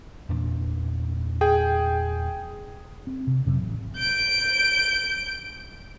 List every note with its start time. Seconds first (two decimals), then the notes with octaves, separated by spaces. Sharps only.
0.29 E2 A#2 D4
1.41 G#4 G5
3.07 C4
3.27 C3
3.46 F2 C3 F#3 C4
3.62 A1
3.97 G6 D7